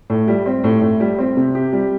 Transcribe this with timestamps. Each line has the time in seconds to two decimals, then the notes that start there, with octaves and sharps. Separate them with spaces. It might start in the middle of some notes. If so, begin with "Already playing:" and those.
0.10 A2
0.28 G3
0.46 C4
0.64 A2
0.82 A2
1.00 G3
1.19 C4
1.37 C3
1.55 G4
1.73 G3